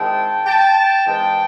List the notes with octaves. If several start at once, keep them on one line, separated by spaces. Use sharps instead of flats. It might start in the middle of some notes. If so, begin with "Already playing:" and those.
Already playing: D#3 G#3 C4 E4 G5 A5
G5 A5
E3 G#3 C4 D#4 G5 A5